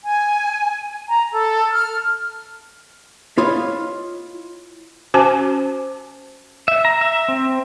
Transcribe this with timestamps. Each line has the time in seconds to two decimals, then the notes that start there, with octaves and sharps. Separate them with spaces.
0.03 G#5
1.08 A#5
1.31 A4
1.73 F6
3.38 E4 F4 C#5 D#5 F5
5.14 C#4 F#4 C5 G#5 A5
6.68 E5
6.85 A#5
7.01 E5
7.28 C4